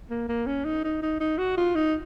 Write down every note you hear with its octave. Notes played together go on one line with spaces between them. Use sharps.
A#3
A#3
C#4
D#4
D#4
D#4
D#4
F#4
F4
D#4